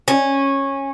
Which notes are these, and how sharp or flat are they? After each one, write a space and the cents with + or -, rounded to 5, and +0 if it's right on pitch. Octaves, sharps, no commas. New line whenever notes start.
C#4 -15